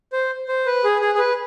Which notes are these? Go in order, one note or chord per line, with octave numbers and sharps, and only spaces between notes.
C5
C5
B4
G#4
G#4
G#4
B4